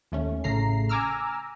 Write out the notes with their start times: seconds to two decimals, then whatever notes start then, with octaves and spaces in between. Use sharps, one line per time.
0.12 D#2 A3 C#4
0.44 A1 A2 C#3 A3 A#5 C7
0.89 G#5 A#5 D6 E6 F6